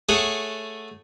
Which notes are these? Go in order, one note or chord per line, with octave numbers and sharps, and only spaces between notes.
A3 G#4 A4 C#5 F#5